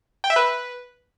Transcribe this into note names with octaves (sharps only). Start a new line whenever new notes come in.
G5
E5
B4